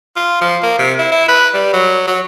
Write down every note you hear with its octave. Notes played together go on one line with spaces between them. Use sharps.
F4
F3
A#3
C3
E4
E4
B4
G3
F#3
F#3